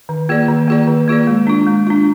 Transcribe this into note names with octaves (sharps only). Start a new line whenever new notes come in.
D#3
A#3 F4 G#4 D5
D#3
A#3 F4 G#4 D5
D#3
A#3 F4 G#4 D5
G#3
D4 F4
G#3
D4 F4